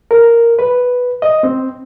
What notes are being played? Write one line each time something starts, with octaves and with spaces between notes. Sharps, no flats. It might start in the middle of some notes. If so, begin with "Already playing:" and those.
A#4
B4
D#5
C4